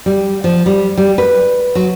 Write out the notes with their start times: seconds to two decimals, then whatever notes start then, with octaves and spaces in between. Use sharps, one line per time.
0.06 G3
0.44 F3
0.66 G3
0.97 G3
1.18 B4
1.75 F#3